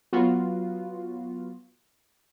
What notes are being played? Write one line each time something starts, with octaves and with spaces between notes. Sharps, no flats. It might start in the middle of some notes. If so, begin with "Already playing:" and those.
F#3 B3 F4 F#4